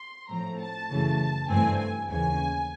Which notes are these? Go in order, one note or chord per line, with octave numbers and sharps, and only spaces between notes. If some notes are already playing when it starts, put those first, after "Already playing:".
Already playing: C6
A2 F3 A3 C4 A#5
A5
F#2 C#3 E3 A3
G2 E3 A3 C4 G#5
G#5
D#2 C#3 E3 G#5